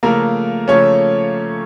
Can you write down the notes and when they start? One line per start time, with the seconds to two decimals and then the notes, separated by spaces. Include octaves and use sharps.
0.03 C#3 F3 A3 A#3 A#4
0.68 C#3 F3 A3 C#4 C#5